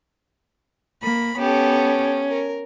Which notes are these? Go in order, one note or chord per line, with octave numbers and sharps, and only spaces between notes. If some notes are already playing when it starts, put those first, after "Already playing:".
A#3 B5
B3 C#4 G4 A4
A#4